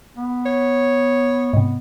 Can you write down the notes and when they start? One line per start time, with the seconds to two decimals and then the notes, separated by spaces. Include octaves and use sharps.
0.17 B3
0.46 C#5
1.53 G#2 C3 B3